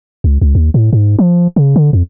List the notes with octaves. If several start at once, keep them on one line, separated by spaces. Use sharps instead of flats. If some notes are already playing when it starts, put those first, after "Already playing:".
C#2
C#2
D#2
A2
G#2
F3
C#3
D3
F2